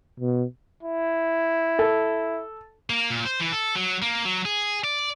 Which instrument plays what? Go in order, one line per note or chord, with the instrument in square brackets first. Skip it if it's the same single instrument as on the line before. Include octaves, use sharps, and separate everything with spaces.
[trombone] B2
[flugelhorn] E4
[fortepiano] A4
[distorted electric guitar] A#3
A#2
C5
E3
A4
F#3
A#3
F#3
G#4
D5